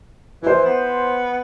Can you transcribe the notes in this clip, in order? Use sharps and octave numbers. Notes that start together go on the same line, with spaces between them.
E3 E4 C5
B3